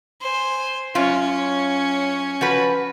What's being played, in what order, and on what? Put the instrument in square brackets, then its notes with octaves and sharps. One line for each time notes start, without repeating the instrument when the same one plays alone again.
[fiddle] C5 G#5
[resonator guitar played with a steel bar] F#2 F4 [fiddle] C#4 C#5
[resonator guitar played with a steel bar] F3 F#4 B4